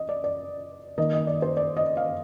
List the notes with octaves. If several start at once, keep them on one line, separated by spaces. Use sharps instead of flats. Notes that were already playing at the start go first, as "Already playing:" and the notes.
Already playing: D#5
D5
D5
D#3 A#3 D#5
D#5
D5
C5
D5
D#5
F5